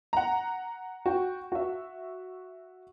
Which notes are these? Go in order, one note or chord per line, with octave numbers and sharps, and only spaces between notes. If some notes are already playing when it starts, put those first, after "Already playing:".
F#5 A#5
F#4 G5
F#4 E5